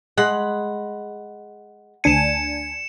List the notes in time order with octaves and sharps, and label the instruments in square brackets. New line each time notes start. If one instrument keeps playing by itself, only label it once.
[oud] G#3 [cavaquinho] F#5 B5 C6
[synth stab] D2 D4 G#5 [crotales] C#7 E7